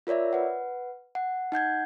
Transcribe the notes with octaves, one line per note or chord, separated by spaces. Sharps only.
F4 A#4 C#5 D5 E5
B4 F#5
F#5
D#4 F#5 G6 G#6